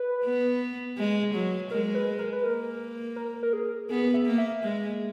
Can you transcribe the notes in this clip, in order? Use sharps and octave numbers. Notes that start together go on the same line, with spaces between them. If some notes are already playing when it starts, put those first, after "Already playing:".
Already playing: B4
B3
G#3
F#3
G#3 A#4
B4
A#4
B4
A#3 A#4
A#4
A#4
G#4
B3 G#4
E5
A#3
E5
G#3